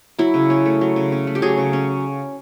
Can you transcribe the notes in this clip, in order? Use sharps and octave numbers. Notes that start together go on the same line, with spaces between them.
F#3 E4
C#3
C#4
A3
F#3
C#3
C#4
A3
G4
F#3 G#4
C#3
C#4